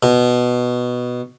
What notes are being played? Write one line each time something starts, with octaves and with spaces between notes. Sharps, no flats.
B2